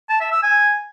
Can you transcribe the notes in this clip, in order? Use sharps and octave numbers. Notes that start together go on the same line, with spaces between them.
A5
E5
E6
G#5